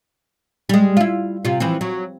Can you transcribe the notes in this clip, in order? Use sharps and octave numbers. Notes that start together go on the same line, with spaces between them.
G3 G#3
E4 F4
C3 F4
E3 F3 C4
F#3